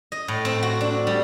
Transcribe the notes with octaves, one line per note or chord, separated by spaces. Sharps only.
D#5
A2
C4
F#4
D4
G3